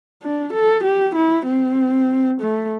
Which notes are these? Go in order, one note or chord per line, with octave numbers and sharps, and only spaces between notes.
D4
A4
G4
E4
C4
A3